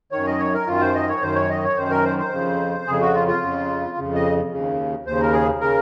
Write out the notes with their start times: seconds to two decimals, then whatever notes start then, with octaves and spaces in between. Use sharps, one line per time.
0.12 F#2 D#3 C#5
0.27 D#5
0.39 C#5
0.54 A#4
0.67 F#2 D#3 F4
0.81 C5
0.95 D#5
1.09 C#5
1.22 F#2 D#3 C5
1.35 C#5
1.50 D#5
1.64 C#5
1.77 F#2 D#3 C5
1.90 A#4
2.04 C5
2.19 C5
2.32 F2 C#3
2.86 F2 C#3 G#4
3.01 F#4
3.14 F4
3.28 F4
3.41 F2 C#3
3.97 F2 C#3
4.15 D#5
4.51 D#2 C#3
5.06 D#2 C#3 C5
5.21 A#4
5.33 G#4
5.61 C#3 A#4